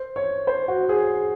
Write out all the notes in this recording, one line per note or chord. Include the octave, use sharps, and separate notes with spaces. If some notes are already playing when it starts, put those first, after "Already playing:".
Already playing: C5
C#5
C5
F#4
G#4